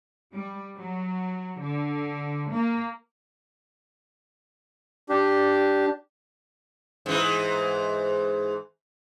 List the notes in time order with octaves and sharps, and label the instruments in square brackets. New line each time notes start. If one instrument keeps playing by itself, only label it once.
[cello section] G3
F#3
D3
A#3
[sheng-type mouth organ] D4 G4
[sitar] G#2 E3